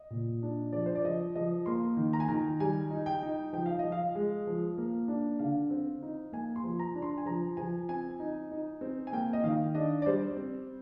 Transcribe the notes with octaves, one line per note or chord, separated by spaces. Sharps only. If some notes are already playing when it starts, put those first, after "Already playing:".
Already playing: D#5
A#2
D4
F3 D5
C5
D5
F3 D#5
F3 D#5
A#3 C6
D#3
A#5
G#5
D#3 A#5
G3 G#5
D#4
G5
D#4
F3 G5
F5
D#5
F3
F5
G#3
F3
A#3
D4
D3 F5
C4
D#4
A#3 G#5
C6
F3
A#5
D4
C6
G#5
F3 A#5
F3 G#5
C4 G#5
D#4
D#4
C4
G#5
A#3 G5
D#5
D#3 F5
D4 D#5
D5
G3 C5
C4